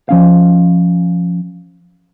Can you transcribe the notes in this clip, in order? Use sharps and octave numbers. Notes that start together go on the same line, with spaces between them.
F3 C#4 F5